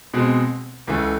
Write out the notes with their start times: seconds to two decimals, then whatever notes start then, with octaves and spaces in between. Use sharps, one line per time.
0.14 B2 G#3 C4
0.87 C#2 C#3 E3 A3